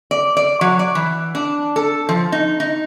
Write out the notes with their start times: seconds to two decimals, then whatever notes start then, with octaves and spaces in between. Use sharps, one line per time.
0.11 D5
0.37 D5
0.61 F#3
0.79 D5
0.95 E3
1.35 D4
1.76 A4
2.09 F3
2.32 D#4
2.60 D#4